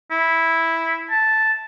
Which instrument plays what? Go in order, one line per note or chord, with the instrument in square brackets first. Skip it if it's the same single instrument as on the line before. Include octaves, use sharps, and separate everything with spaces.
[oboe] E4
A5